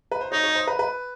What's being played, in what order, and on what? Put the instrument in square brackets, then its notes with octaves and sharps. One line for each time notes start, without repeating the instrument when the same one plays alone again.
[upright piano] B4
C5
[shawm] D#4 [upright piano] C#5
[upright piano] C#5
C5
B4
B4